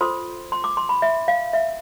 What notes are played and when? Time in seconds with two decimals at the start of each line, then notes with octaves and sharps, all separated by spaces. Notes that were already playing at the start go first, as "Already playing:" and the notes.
0.01 F4 A4 C5 C6
0.52 C6
0.64 D6
0.77 C6
0.89 B5
1.02 E5
1.28 F5
1.53 E5